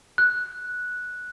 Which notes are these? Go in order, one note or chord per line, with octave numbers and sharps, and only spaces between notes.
F#6